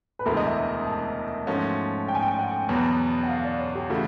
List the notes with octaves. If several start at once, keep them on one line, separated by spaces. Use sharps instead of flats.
B4
E1 D2 C3 E3 G#3 A#4
D#5
E5
A5
G#2 F3 A3 C#4 F#4
G5
G#5
G5
F#5
E2 B2 F#3 B3
F#5
F5
D5
C#5
G4
C#3 E3 A3 F#4